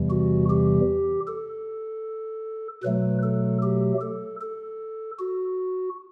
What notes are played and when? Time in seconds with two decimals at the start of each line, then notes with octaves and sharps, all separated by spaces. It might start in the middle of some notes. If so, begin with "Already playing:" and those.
Already playing: E2 C3 E3 G3
0.10 F#4
0.50 G4
1.27 A4
2.83 B2 F#3 A3 B4
3.23 A4
3.63 G4
4.01 A4
4.41 A4
5.19 F#4